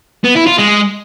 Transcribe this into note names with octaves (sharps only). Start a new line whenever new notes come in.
B3
E4
F4
G#3